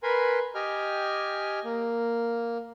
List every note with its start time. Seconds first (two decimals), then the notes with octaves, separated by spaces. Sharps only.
0.03 A#4 B4 G#5 B5 C6
0.55 G4 D#5 G5 G#5 F6
1.64 A#3